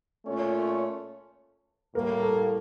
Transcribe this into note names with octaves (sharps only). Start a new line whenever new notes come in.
A#2 A3 C#4 F4 C#5
A2 G3 A#3 A#4
A4